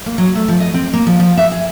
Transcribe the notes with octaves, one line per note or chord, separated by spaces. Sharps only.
A#3
F#3
A3
F3
D#5
C4
A#3
F3
F3
E5
G#4